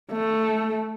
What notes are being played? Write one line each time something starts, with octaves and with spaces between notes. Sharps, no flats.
A3